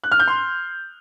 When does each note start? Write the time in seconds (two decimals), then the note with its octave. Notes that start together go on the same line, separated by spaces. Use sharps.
0.04 F#6
0.12 F6
0.20 G6
0.28 C6